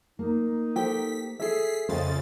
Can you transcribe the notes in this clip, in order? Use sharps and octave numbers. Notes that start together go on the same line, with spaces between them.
A#3 D#4
G4 A4 C5 B6
G#4 A4 E5 B6 C7
F2 C#3 F3 C5 D#5 A6